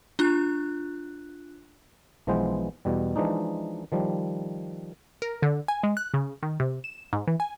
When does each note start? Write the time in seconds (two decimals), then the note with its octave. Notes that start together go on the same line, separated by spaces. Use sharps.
0.19 D4 F4 F#6
2.27 B1 E3 F3 G#3 B3 C5
2.85 E2 B2 G3
3.16 E3 F3 G#3 D4 D#4
3.92 D#3 F3 G3
5.22 A#4
5.42 D3
5.68 G#5
5.83 G#3
5.97 F#6
6.14 C#3
6.43 D#3
6.60 C3
6.84 E7
7.13 G#2
7.28 E3
7.40 G#5